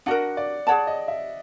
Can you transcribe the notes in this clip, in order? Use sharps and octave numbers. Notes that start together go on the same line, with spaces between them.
D4 F#4 A#4 F#5
D5
G#4 C#5 D5 F#5 A5
D#5
E5